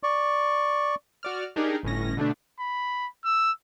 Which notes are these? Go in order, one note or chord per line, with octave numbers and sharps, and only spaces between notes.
D5 C#6
F#4 D5 F6
D4 D#4 G4 G#4 A#4
G1 A2 C#4 A#6
B2 D3 A3 D4
B5
E6